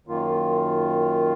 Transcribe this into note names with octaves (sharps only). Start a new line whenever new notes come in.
F#2 D#3 A#3 F4